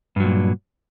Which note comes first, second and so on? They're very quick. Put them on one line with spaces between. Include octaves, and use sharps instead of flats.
G2 F#3 A#2